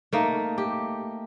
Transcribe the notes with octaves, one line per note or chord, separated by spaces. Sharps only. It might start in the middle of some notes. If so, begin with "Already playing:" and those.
A3 A#3 D#4
G4